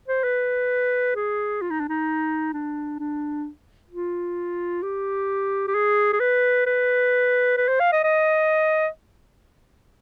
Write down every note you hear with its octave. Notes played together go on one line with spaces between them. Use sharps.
C5
B4
G#4
F4
D#4
D4
D#4
D4
D4
F4
G4
G4
G#4
G#4
B4
B4
B4
C5
F5
D#5
D#5